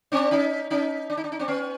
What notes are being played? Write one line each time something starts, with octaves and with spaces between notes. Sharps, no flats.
C4 D4
C#4 D#4
C#4 D#4
D4
D#4
D4
D#4
C4 D4
B3 C#4